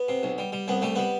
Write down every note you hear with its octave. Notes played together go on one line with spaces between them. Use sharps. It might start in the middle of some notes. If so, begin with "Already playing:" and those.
Already playing: B3
C3
B1
G3
G3
C2 B3
G3 A3
G3 B3